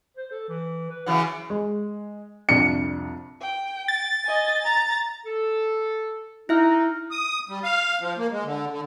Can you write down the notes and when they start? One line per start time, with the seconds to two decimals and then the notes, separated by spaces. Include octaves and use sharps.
0.17 C5
0.31 A4
0.49 E3
0.90 B4
1.06 C#3 E3 F#3 F#5
1.50 G#3
2.49 C2 F2 D4 C#7
3.41 G5
3.88 A6
4.25 D#5 G#5
4.64 A#5
5.25 A4
6.49 D#4 E4 E5 F6
7.11 D#6
7.49 G3
7.64 F5
8.01 F3
8.17 A#3
8.31 G#3
8.44 D3
8.70 D3